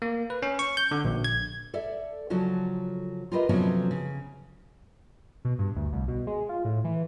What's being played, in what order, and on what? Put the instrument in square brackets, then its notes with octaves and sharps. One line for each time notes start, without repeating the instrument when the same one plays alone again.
[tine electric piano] A#3
B4
C#4
C#6
G6
D3
A#1
G#6
[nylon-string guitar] A4 D5 E5
C#3 F3 F#3 F#4 A4
F4 G4 A#4 B4 D#5 E5
C3 F3 F#3 B3 C#4 A4
C#3
[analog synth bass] B2
G2
D2
C2
B2
G#3
F4
A2
E3